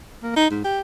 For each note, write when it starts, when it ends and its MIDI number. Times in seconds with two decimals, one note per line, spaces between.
0.23 0.34 58
0.36 0.46 63
0.51 0.63 44
0.64 0.81 67